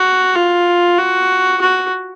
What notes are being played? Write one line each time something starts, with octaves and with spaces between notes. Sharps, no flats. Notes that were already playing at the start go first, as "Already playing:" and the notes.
Already playing: F#4
F4
F#4
F#4